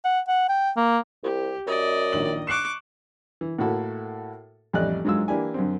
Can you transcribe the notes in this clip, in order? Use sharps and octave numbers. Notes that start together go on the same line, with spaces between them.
F#5
F#5
G5
A#3
C2 G4
F#2 D5 D#5
A#1 D#3 F#7
C#6 D6 F#6 C7 E7
E3
A2 A#3 E4 F#4 A4
A1 F2 G3 D5 D#5 F#6
G#2 F#3 G#3 F4 E6
E3 A#3 D4 E4 G4 G#5
F#2 D3 C4